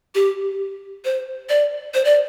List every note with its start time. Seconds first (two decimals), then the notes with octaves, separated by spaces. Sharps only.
0.15 G4
1.05 C5
1.49 D5
1.94 C5
2.05 D5